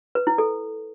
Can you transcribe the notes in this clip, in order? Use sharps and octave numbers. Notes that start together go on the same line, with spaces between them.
B4
E4
A4